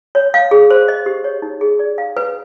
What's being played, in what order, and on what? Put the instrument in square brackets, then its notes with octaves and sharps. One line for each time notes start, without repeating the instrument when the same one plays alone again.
[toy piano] C#5
F5
G#4
C5
D#5
G4
C#5
D#4
G#4
D5
F5
B4